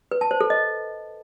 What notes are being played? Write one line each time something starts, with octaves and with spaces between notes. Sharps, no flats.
B4
A5
C5
A4
D#5